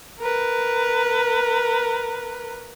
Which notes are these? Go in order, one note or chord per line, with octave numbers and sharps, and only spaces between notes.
A#4 B4